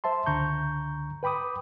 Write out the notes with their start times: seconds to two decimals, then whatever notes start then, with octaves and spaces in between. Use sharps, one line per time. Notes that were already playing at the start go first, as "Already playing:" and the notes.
0.04 C5 E5 A5 C6
0.26 C#2 D3 A#5 C#6 G6
1.23 B4 G5 B5 D6 D#6